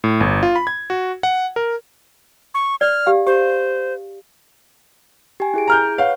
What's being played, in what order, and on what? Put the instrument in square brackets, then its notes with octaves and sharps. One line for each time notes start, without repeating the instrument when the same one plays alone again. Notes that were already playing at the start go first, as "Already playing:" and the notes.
[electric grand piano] A2
G1
F4
B5
G#6
F#4
F#5
A#4
[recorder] C#6
[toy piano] D5 [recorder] F6
[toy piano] G4 F5
[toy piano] G4 [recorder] C5
[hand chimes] G4 G#5
E4 G#4 D7
[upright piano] A#5 F6 G6
[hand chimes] B4 C#5 F#5 [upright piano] F5